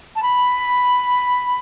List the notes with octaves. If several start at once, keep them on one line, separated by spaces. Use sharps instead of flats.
A5
B5